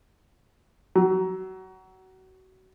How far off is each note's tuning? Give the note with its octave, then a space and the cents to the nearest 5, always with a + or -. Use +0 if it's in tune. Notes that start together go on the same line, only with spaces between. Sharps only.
F#3 +30